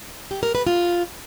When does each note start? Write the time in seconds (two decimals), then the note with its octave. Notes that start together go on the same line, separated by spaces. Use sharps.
0.31 G4
0.43 A#4
0.55 B4
0.67 F4